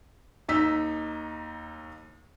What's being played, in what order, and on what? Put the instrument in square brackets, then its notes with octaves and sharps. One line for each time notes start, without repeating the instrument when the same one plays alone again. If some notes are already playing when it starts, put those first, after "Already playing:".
[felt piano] D#2 D#4 E6 B6